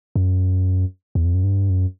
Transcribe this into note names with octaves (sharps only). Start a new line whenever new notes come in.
F#2
E2
F2
F#2
G2
F#2